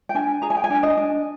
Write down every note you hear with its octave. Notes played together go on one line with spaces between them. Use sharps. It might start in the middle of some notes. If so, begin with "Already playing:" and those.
G5
D4 G#5
G#4 A#5
G#5
G5
G#5
D4
D#5
D4